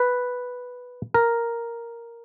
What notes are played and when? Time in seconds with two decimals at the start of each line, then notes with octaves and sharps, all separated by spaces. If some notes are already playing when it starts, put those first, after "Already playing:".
Already playing: B4
1.14 A#4